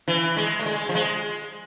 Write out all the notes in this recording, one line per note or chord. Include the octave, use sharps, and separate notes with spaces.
E3
G#3
A3
G#3
F3
G#3